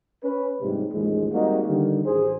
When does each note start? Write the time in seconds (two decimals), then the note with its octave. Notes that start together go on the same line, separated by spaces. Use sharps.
0.24 C#4 B4
0.61 A#1 G#2 C3 G3
0.93 A1 D#2 F3 G#3
1.32 G3 G#3 A#3 C4 D#4 F#4
1.67 D3 D#3 G3
2.05 A1 G#4 C5